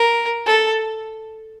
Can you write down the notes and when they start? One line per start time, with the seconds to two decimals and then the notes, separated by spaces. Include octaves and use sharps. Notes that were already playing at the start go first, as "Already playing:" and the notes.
Already playing: A#4
0.46 A4